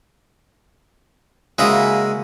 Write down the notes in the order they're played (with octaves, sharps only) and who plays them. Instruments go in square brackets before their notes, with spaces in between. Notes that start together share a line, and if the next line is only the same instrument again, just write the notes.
[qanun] C#3 A#3 F#4 [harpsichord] G#3 E4 D#6